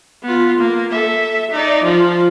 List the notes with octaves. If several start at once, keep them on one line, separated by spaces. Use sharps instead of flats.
B3 F4
A#3
A4 E5
D#4 D5
F3 F4